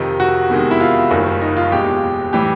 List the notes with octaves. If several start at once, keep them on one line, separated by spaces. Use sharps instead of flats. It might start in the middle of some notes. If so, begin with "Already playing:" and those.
Already playing: F2 C3 D#3 D#4
F#4
E2 C3 D#3 G#3
E4
F4
F#1 F#2 D#3 G3
D#4
F4
F#1 E2 B2 G#3 G4
A2 E3 G3 G4